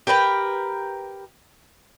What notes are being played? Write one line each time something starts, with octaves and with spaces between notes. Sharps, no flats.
G4 A#4 B4 G5